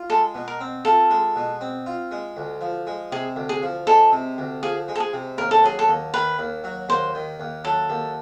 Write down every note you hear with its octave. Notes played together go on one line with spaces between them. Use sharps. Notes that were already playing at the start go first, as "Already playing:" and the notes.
Already playing: F4
G#3 A4
B2
A#4
C4
F4 A4
G#3
B2
C4
F4
G#3
D2
F3
G#3
C3 G#4
D2
G#4
F3
G#3 A4
C3
D2
F3 G#4
G#3
A4
G#4
C3
D#2 A#4
A4
F#3 G#4
A4
D#2
D#3 B4
D#2
F#3
D#2 C5
D#3
D#2
F#3 A4
D#2